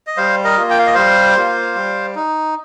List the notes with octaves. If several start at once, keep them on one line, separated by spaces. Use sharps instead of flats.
D#5
G3 C5 F5
A#4 D#5
A#3 F4
G5
F5
D#5
G3 C5 F5
A#3 F4
G3
D#4